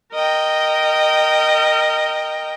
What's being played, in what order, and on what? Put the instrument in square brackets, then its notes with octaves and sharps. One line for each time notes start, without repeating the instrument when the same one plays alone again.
[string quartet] A#4 D#5 G5